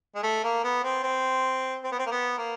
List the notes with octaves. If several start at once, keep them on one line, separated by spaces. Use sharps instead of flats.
G#3
A3
A#3
B3
C4
C4
C4
B3
C4
A#3
B3
A#3